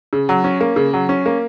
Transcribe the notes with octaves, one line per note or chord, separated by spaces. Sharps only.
C#3
F#3
C#4
A#3
C#3
F#3
C#4
A#3